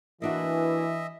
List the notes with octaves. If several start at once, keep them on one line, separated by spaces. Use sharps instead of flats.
E3 A#3 D4 E4 F#4 D#5 E5